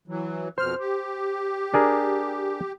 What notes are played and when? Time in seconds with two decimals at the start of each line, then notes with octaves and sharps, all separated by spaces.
0.08 E3 F#3
0.58 F2 B2 C5 F6
0.80 G4
1.74 D4 G#4 A#4